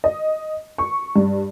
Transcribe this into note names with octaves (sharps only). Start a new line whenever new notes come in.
D#5
C#6
G2